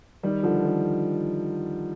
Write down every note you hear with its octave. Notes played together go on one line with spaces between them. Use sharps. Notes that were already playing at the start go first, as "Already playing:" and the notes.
D#3 G3
D3 F3
D#3